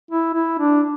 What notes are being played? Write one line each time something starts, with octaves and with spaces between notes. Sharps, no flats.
E4
E4
D4